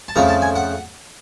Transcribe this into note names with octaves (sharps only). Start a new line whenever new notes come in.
A5
F2 C#3 F3 A3 A#5
A5
G#5
F#5